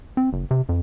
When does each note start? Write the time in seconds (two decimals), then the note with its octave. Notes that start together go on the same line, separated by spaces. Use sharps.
0.17 C4
0.33 F#1
0.51 C3
0.69 F2